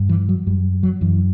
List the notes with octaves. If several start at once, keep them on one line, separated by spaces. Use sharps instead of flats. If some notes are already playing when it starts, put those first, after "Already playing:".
Already playing: G2
E3
F#3
F#2 G3
F#3
F#2 E3